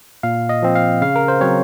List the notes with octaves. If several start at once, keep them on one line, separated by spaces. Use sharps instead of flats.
A#2 F5
D#5
F3 C4
F5
C#3 F5
A#4
C5
F#3 C4 C#5